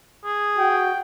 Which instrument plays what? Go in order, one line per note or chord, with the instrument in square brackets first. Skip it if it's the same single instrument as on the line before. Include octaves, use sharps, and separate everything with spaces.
[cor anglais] G#4
[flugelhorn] F#4 [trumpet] G5